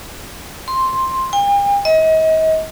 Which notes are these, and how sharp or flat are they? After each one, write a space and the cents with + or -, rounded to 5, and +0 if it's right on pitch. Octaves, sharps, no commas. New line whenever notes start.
C6 +5
G5 +45
D#5 +35